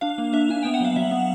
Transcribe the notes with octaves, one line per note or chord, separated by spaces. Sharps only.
D4 F5
A#3
D4 E5
D4 G#5
B3 G5
F#5
F#3 F5
F#3 E5
B3